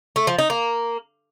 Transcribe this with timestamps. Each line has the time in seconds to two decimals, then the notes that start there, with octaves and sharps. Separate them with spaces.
0.16 A3
0.27 F3
0.39 D#4
0.50 A#3